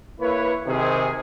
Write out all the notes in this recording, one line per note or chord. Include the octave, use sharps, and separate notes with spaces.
A#3 E4 B4 C#5
C3 D#3 G#4